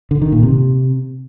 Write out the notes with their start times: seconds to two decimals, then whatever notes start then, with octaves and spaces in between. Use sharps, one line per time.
0.11 D3
0.22 D#3
0.32 A#2
0.43 C3